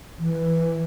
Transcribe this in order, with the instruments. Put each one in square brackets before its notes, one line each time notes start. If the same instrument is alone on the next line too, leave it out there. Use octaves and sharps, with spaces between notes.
[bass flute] E3